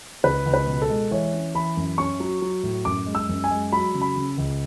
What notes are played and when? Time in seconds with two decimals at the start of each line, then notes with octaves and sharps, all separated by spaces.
0.24 C#2 B4
0.46 C#2
0.54 B4
0.67 B2
0.82 A4
0.90 G#3
1.11 E3 C#5
1.34 C#4
1.55 E3 B5
1.77 F#2
1.98 C#4 C#6
2.20 F#3
2.42 F#3
2.63 A2
2.85 F#2 D6
3.06 G#3
3.15 E6
3.29 F#2
3.44 G#5
3.50 G#3
3.72 F#3 B5
3.94 C#3
4.01 B5
4.16 C#3
4.38 C#2